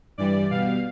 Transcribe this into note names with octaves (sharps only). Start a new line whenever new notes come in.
G2 E3 G3 D5
B2 G3 F5